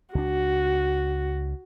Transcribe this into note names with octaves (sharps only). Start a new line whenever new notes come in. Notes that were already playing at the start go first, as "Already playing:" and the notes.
C#2 D4 F#4